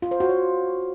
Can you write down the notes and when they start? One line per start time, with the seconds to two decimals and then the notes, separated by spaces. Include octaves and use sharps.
0.02 F4
0.11 C5
0.20 F#4
0.29 C#5